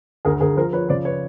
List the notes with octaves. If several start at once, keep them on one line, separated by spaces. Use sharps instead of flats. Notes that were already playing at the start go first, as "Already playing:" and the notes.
D2 G#4 A#4
D2 G#4 A#4
F3 A#4 C5
F3 B4 C#5
C#3 C5 D5
B4 C#5